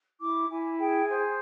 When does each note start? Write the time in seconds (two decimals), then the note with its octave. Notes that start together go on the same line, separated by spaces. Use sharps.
0.19 E4 D6
0.48 E4 G#5
0.78 G#4 G5
1.06 C5 G#5